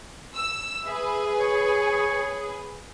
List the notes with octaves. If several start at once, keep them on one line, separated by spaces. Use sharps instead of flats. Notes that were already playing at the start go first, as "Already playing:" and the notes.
E6
G#4 B4 E5
C#5